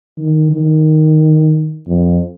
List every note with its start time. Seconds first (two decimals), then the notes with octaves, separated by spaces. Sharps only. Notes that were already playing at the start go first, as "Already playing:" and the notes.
0.18 D#3
0.51 D#3
1.87 F2